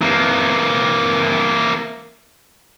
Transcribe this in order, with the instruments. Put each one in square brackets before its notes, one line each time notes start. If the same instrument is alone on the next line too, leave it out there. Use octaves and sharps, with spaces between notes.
[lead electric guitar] E3 A#3